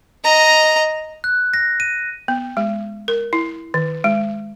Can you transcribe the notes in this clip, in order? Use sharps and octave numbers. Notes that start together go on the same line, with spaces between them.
D#5 A#5
F#6
A#6
D#7
B3
G#3
A#4
E4
D#3
G#3